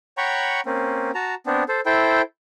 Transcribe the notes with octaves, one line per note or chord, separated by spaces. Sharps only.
C#5 F#5 G5 A#5 B5 C#6
A#3 C4 C#4
F#4 A5 A#5
B3 C4 D4
A4 C5
E4 A4 C5 G5